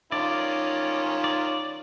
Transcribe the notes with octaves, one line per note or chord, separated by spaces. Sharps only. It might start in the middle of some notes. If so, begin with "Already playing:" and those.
D#3 C#4 F4 D5
D5